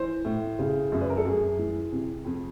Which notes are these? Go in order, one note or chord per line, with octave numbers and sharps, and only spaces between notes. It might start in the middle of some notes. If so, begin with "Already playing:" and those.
Already playing: E3 C5
A2
C#3
F#2
B4
A#4
A4
F#2 G#4
E3
C3
F2